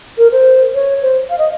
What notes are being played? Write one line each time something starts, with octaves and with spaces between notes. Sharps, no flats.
A#4
C5
C#5
C5
F5
D#5